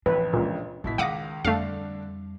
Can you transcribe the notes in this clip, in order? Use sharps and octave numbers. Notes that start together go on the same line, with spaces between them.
A1 F2 D4 B4
C#2 A#2
A1 B2 D#3 E4 B6
C#2 D#3 F5 F#5 D6 D#6 A#6
F2 D3 G3 A3 D4 F5